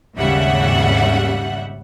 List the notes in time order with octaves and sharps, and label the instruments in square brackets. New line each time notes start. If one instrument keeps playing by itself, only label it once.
[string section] G#1 D#2 C#3 G3 E5 F#5